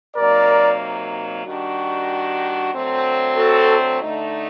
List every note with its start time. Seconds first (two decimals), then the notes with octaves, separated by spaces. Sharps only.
0.17 C3 F#3 A#3 D#4 A#4 D5
1.45 D#3 G3 D4 F#4
2.74 D3 F#3 A3 C4
3.38 F#4 A4
4.02 D3 A3 D#4